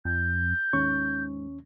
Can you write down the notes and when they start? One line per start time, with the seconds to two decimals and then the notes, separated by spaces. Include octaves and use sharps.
0.05 F2 G6
0.73 D#2 G#2 C#4 C#6